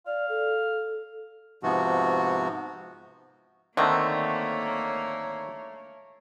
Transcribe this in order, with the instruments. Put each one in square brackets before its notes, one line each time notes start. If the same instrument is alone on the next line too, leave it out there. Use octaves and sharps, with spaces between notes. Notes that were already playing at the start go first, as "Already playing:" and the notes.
[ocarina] D5 [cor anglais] F5
[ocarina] A4
[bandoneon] G#2 C3 F3 B3 F#4
[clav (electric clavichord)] D3 D#3 C4 [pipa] A3 [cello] A#3 C#5